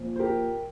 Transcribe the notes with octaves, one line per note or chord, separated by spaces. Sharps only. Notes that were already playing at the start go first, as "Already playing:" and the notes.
Already playing: A#2 F3
C5
G4 A#4